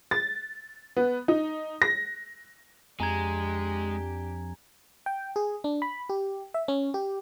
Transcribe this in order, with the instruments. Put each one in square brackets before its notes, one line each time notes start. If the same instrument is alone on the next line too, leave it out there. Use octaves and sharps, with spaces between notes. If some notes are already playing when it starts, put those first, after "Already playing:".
[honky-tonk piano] A6
B3
D#4
A#6
[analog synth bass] F2 [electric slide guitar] G#3 [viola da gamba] D4 G4 [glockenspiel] G#5 A#5 G#6
[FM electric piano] G5
G#4
D4
B5
G4
E5
C#4
G4